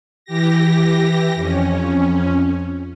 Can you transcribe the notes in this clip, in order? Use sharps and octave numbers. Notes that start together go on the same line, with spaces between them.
E3 G4 A#6
F2 C#4